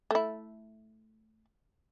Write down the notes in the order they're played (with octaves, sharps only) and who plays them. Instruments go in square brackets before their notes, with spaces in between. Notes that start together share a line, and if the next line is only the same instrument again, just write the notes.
[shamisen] A3 E4